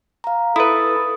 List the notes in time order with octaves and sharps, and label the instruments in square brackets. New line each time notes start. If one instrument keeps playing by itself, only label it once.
[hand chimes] F5 A#5
[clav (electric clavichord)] E4 B4 [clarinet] A4 [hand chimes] D#6